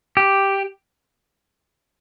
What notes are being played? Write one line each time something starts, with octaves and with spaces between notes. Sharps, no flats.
G4